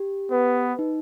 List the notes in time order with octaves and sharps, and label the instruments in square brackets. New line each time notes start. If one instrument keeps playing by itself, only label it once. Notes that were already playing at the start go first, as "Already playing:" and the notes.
Already playing: [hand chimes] G4
[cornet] B3 [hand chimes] B4
[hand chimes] D#4